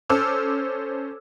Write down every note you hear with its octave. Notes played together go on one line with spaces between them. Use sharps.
C#4 A4 C5 D6 E6 F6